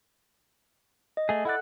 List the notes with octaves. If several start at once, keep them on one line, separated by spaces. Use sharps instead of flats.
D#5
A3 G#4
E4 A4 D5 F#5 F#6